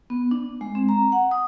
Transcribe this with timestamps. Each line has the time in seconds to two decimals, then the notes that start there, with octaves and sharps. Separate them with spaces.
0.10 B3
0.31 D4
0.61 G#3
0.75 C4
0.89 A#5
1.12 F#5
1.31 D#6